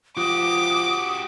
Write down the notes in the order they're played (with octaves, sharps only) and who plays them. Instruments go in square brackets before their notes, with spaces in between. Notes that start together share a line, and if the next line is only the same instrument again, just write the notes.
[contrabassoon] F3 [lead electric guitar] F#4 G4 [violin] D6 [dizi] D#6